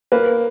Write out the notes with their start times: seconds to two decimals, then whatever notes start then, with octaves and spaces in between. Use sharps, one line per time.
0.12 A#3 B4